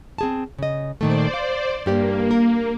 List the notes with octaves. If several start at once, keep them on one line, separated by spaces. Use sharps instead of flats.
C4 G#4 A5
C#3 D#5
A#2 D#3 A3 C5 D5
F5
G2 A#3 G4 D5
A#4